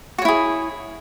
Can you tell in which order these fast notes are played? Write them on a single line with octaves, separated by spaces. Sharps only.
F#4 C#5 E4 G#4